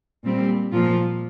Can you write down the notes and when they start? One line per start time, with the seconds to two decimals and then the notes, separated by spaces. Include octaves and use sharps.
0.24 A#2 G3 C4
0.71 A#2 F3 A#3 F4